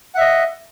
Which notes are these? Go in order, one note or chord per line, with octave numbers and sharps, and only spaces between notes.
D#5 E5 F#5